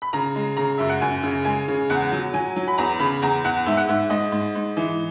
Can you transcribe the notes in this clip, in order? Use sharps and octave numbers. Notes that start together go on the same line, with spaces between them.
B5
C#3 A#5
G#3
C#3 A#5
F#2 E5
F#5
F#2 G#5
C#3
G#3 G#5
C#3
E2 F#5
F#3
F#3 G#5
F#3
B5
E2 A#5
C#3 B5
E2 A#5
E2 F#5
G#2 E5
F#5
G#2 E5
G#2 D#5
G#2
G#2
E3